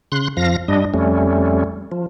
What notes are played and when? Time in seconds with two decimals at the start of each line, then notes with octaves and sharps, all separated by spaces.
0.12 C#3 C6 F#6
0.37 F2 F3 F5 A#6
0.68 G2 G3 D4 D#5
0.94 F2 G3 A3 C#4
1.92 F3